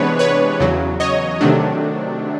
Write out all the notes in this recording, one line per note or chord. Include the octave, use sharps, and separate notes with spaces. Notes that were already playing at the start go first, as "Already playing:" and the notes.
Already playing: C3 E3 G#3 B3 D4 B4 C#5
B4 C#5
E2 C#3 F#3
C#5 D#5
C3 D#3 F#3 A3 D4